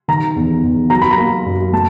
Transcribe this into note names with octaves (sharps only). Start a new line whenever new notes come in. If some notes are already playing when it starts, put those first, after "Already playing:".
D#3 A#5
E2
E2
F#3 A#5
B5
A#5
A#3
F#2
A3 A5